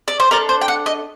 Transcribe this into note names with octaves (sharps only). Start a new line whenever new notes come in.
D5
C5
D4 A4 A#4
C5
G5
F#5
D#5